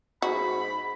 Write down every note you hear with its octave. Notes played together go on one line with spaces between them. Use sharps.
G#2 F#4 B5